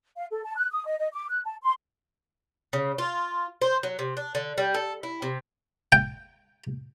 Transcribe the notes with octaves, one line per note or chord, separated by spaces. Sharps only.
F5
A4
A5
F#6
D#6
D#5
D#5
D6
F#6
A5
C6
C#3
F4
C5
F#3
C3
D4
D3
G3
A4
E4
C3
G5